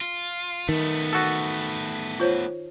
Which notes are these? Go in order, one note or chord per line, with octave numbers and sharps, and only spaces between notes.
F4
D#3 A3 B3
F#4 A4
F4 C5 C#5